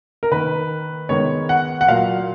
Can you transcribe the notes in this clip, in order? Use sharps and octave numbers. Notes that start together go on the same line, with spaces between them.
A#4
D#3 A#3 B4
D#3 G#3 B3 C#5
F#5
F#5
A#2 F#3 A#3 F5